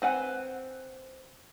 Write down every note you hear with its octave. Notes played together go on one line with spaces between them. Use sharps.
C4 B4 F#5 G#5